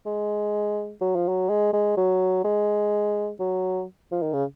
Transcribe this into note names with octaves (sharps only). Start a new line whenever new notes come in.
G#3
F#3
F3
F#3
G#3
G#3
F#3
G#3
F#3
F3
D#3
C#3